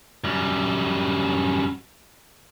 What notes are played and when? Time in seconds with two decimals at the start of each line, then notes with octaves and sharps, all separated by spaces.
0.24 F#2 G3